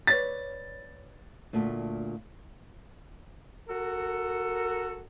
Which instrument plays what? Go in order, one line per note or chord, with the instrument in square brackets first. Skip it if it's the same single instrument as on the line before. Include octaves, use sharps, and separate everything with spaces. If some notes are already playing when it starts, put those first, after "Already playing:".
[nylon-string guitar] B4 C#5 D5 [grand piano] A6
[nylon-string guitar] D2 A#2 A3
[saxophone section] F#4 A4 A#4